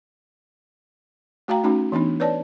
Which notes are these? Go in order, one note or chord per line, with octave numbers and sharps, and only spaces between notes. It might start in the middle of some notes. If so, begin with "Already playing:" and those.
A3 F#4 F5 G5 A#5
A3 C#4 D#4 F#4
E3 B3 D4 D#4
B4 C#5 D5 A5